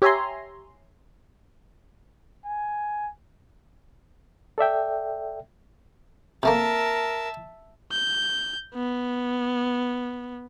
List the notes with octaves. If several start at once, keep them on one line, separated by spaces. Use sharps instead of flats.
G4 C#5 E5 G#5 A#5 C6
G#5
A4 D5 E5 G5
C3 A3 A#3 A#4 E5 A5
G6
B3